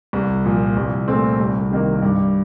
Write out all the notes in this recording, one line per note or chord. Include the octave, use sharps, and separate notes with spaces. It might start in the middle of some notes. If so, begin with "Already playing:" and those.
C2
A#2 F3
C2
A#2 A3 C4
C2
C3 D#3 A#3
G2